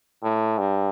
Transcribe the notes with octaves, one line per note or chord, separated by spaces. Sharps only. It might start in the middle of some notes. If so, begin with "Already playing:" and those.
A2
G2